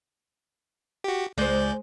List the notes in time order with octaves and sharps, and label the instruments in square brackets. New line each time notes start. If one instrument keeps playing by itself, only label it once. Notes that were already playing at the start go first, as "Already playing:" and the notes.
[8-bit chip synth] F#4 G4
[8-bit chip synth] C#2 D5 G6 [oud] G#3 C5